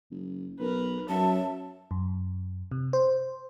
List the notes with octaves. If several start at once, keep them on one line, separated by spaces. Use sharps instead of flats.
F#1
B1 A#4 B4
F#2 F#3 E5 A5
F#2
C3
C5